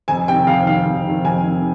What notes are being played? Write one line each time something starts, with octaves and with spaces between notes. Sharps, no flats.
F2 G#5
C3 D#3 G5
F2 F5
C3 D#3 F5
F2
C3 D#3
F2 G#5
C3 D#3